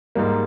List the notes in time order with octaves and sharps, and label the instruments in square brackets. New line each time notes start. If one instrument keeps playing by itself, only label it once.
[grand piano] G#2 G3 A#3